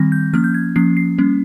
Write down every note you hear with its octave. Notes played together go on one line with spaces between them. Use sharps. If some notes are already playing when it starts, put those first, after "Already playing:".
Already playing: D#3 G3 C4 A#6
G6
F3 A#3 C#4 F6
G6
G#6
F3 A#3 C#4 C7
C7
G3 A#3 C#4